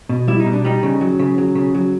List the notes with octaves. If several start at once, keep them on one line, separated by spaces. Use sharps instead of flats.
B2
G3 E4
D#4
B2
D4
G3 D#4
C#3
F#3
C#3
F#3
C#3
F#3